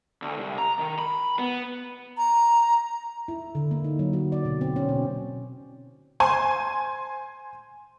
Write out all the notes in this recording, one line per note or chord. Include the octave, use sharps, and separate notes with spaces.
D2
C2
A#5
D#3
B5
B3
A#5
E4
D3
A#3
D#4
F#3
F#4
D5
B2
C4
C#4
B2
C5 G#5 C6